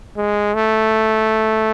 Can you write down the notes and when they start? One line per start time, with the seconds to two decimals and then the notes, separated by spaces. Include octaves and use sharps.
0.17 G#3
0.54 A3